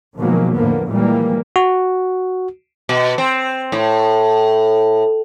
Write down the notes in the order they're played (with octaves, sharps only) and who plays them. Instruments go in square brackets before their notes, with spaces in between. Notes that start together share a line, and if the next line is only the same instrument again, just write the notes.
[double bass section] B2 D#3 F3 F#3 G#3 A#3
E2 A2 D3 F3 A#3 B3
A#2 E3 F3 G3 G#3 A#3
[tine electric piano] F#4
[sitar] B2
C4
A2